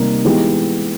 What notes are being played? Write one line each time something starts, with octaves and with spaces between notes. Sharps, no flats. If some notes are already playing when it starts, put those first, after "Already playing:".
Already playing: C3 D#3 G3 A#3 D#4
E3 G#3 B3 D#4 G4